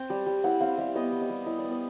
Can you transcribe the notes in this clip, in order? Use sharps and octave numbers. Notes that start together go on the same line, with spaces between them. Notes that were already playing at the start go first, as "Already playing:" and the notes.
Already playing: C4 G5
G3
G3
E4 F#5
C4 F5
G3 E5
B3 D#5
G3
D#5
G3
E4 D#5
D5
B3
D#5